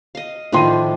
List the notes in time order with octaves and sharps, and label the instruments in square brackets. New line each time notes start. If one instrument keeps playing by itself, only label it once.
[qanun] D#5 F5
[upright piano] A2 C6 D#7 [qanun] D#3 F3 D4